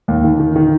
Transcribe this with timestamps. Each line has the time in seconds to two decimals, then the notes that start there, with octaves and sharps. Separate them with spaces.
0.08 D#2
0.24 D#3
0.40 D#3
0.56 D#3